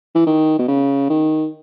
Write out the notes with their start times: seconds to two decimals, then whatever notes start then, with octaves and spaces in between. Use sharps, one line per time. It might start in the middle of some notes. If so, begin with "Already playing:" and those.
0.15 E3
0.27 D#3
0.58 B2
0.68 C#3
1.09 D#3